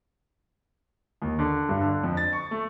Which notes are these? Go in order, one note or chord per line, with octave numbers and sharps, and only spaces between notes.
D#2
D3
G2
D3
F2
A6
C#6
A3